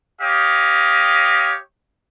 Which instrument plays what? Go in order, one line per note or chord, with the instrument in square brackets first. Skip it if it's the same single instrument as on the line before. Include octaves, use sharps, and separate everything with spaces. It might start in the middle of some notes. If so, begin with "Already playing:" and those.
[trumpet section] G4 C#5 D#5 F5